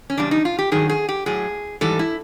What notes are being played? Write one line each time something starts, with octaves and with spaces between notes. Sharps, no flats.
C#4
E2 C#3 G3 D4
D#4
F4
G4
G2 D#3 F#3 G#4
G#4
G4
A2 F#3 G#4
G#2 E3 G3 A4
E4